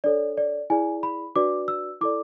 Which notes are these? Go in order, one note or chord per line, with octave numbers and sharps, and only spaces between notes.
D4 A4 C#5 D5
D5
E4 G#4 D5 G#5
B5
D4 F#4 B4 D5 D6
E6
E4 A4 D5 D6